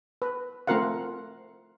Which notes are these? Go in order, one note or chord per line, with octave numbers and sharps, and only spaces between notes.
B4
A3 C4 F4 A#4 F5 F#5